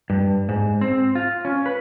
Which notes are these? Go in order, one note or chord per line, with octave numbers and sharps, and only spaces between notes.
G2
G#2
C4
F4
C#4
B4